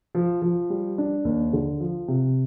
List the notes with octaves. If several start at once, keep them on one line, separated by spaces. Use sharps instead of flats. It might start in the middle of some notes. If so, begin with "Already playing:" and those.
F3
F3
G3
D4
D#2
D3
F3
C3